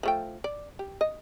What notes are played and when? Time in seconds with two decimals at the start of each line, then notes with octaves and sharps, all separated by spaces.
0.03 F3 A3 G5
0.44 D5
0.79 G4
1.01 D#5